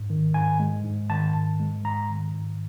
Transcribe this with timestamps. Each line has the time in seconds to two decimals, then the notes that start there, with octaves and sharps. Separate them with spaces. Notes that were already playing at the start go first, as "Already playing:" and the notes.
Already playing: G#2
0.10 D#3
0.34 G#2 G#5
0.60 G#3
0.84 G#2
1.10 D#3 A5
1.35 G#2
1.60 G#3
1.85 G#2 A#5
2.09 D#3
2.35 G#2